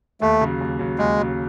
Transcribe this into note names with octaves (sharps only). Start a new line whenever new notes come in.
D#2 A3
C#3 F#3
D#2
C#3 F#3
D#2 G#3
C#3 F#3